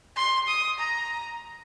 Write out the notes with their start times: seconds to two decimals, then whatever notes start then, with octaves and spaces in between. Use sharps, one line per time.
0.16 C6
0.48 D#6
0.79 A#5